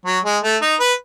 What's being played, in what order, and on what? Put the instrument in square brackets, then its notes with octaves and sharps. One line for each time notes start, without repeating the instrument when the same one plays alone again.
[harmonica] F#3
G#3
A3
D#4
B4